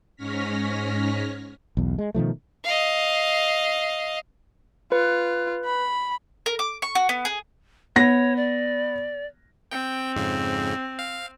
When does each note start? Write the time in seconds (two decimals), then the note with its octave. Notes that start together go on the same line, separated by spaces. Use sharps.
0.16 G#2 C#4 C#5 F6 A#6 B6
1.77 B1 E2
1.98 G#3
2.15 B2 D#3 F3 A3
2.64 D#5 F5
4.92 F4 B4
5.66 B5
6.46 A#4
6.59 D6
6.82 C#6
6.95 F#4
7.09 B3
7.25 G#4
7.96 B3 C#5 A#6
8.36 D5
9.71 C4 G5
10.16 F2 G#2 C#3
10.99 F5